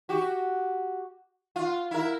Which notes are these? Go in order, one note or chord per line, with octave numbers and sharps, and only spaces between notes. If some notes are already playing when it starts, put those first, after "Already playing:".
F#4 G4
F4
E4 A#4